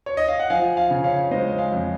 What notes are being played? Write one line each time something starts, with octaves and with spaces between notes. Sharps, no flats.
C#5
D#5
F5
F#5
F3 F5 G#5
F5 G#5
C#3
C#5 F5
G#3 C5 D#5
F5 G#5
F2